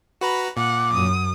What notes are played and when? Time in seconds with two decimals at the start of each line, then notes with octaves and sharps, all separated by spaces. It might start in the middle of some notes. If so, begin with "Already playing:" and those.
0.21 F#4 B4 A#5 B5
0.57 A#2 F#5 D6
0.93 F#2 D#6